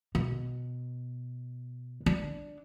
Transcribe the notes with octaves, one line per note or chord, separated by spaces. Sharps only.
B2
D4